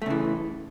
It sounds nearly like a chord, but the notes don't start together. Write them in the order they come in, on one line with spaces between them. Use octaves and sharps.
A3 C#3 E3